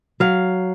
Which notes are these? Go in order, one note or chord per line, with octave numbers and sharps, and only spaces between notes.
F#3 F5